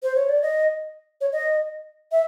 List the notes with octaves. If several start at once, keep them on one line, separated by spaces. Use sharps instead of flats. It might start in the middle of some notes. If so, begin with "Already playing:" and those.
C5
C#5
D5
D#5
C#5
D#5
E5